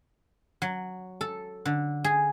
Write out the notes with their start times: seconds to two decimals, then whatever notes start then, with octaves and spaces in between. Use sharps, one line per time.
0.62 F#3
1.21 A4
1.65 D3
2.04 G#4